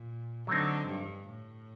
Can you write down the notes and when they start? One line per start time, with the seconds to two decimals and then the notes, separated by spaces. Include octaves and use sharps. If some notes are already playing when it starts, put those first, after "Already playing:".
Already playing: A#2
0.47 D3 F#3 A3 C4 D#4
0.89 G2
1.29 A2